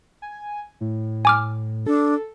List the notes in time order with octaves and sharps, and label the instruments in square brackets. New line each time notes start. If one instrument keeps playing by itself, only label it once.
[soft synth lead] G#5
A2
[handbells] G#5 D6 F6
[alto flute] D4 [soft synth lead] A4